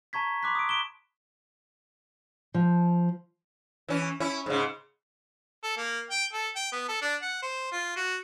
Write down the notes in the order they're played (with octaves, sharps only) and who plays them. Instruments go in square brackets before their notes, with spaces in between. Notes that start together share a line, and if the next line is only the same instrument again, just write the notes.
[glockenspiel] A5 A#5 C#6 G#6 B6
B5 C6 D6 F#6 B6
D#6 D7
D7 E7 G7
[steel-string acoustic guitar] F3
[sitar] E3 C#4
C#4 E4
G#2 C#3
[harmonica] A4
A#3
G5
A4
G5
B3
A4
D4
F#5
C5
F4
F#4